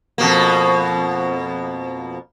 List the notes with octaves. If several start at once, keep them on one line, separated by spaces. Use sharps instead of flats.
F2 B2 A#3